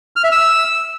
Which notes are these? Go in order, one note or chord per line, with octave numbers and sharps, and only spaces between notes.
F6
E5
E6